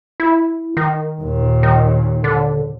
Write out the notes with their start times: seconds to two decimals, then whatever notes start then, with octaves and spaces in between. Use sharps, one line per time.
0.20 E4
0.77 D#3
1.21 D#2 A#2
1.63 D#3
2.24 D3